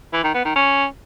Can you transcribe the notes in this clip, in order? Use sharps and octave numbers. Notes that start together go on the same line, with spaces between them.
E3
D#3
B3
D#3
C#4